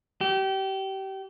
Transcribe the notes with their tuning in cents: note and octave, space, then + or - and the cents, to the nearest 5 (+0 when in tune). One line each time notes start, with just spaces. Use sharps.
G4 -30